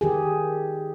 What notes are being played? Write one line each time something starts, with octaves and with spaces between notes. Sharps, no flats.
D#3 G4 G#4